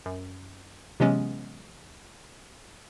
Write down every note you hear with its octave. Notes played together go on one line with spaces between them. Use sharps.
F#2
C3 E3 F#3 G#3 B3 C#4